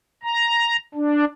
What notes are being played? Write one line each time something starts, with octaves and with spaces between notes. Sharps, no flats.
A#5
D4